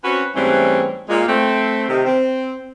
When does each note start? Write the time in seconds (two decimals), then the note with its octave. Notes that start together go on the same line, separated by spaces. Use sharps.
0.04 C4 C#4 F#4 B4 C#5
0.35 G#2 E3 G3 A3 C4 C#4
1.09 A#2 G#3 F4
1.28 A3 C4
1.89 C3 D#3
2.06 C4